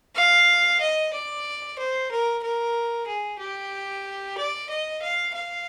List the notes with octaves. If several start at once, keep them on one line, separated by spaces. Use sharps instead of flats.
F5
D#5
D5
C5
A#4
A#4
G#4
G4
D5
D#5
F5
F5